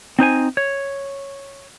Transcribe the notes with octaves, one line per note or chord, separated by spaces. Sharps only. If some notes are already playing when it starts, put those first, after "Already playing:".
C4 D#4 C5 G#5
C#5